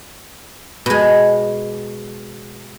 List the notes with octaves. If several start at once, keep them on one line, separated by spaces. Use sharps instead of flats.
B2 G#3